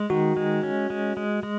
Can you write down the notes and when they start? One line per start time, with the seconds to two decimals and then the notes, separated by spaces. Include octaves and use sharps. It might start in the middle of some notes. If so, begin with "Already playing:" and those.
Already playing: G#3
0.10 D#3 F#4
0.37 G#3
0.63 C#4
0.90 G#3
1.17 G#3
1.43 G#3